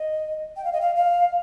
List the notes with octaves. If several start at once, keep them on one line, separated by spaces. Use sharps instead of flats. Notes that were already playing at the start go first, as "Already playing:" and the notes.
Already playing: D#5
G5
F5
D#5
F5
F5